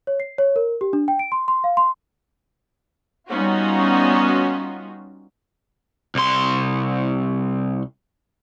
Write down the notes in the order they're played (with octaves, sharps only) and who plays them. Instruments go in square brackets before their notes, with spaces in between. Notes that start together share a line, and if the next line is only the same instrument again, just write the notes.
[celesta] C#5
C7
C#5
A#4
G4
D4
G5
D7
C6
C6
F5
C6
[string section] G3 B3 C#4 D#4 F4 F#4
[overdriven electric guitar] C2 C6